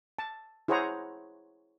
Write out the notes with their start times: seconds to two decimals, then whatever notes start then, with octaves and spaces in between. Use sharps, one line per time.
0.19 A5
0.68 E4 G#4 C5 C#5 F#5 A#5